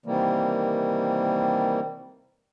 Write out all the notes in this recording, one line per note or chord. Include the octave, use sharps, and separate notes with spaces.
C3 D#3 E3 G3 A#3